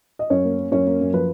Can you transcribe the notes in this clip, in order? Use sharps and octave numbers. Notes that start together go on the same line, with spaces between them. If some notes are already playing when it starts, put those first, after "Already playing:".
D#5
F#2 C#4 C#5
A#3
A#3
F#2 C#4 C#5
A#3
F#2
F3 B4